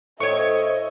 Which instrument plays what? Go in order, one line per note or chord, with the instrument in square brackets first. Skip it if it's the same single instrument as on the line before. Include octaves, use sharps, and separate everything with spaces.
[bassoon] A2 [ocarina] C5 [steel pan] C#5 C#6 [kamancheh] D#5 E5